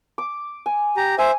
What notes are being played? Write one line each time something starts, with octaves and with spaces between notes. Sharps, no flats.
D6
G#5
G4 A#5
C5 E5 G#5